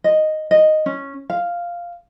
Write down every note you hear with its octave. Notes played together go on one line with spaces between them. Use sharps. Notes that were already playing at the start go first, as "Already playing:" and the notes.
D#5
D#5
C#4
F5